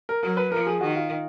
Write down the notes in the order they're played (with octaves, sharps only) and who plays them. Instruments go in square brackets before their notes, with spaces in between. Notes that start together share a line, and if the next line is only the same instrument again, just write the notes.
[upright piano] A#4
[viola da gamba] F#3 [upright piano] A#4
[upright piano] B4
[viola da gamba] F3 [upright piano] A#4
[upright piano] G#4
[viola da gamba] D#3 [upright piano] F#4
[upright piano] F4